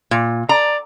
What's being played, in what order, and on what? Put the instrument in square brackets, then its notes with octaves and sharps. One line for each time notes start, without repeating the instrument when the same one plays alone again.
[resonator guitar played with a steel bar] A#2
[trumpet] D5 [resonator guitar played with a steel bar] A#5